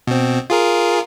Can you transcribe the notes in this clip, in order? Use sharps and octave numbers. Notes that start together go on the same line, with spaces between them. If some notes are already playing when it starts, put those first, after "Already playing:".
B2 C4
F4 G#4 A#4